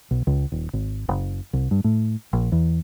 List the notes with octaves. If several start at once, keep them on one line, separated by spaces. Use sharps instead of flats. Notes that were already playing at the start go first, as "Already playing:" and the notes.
B1
C#2
D#1
G#1
F#1
C2
G2
A2
A#1
E2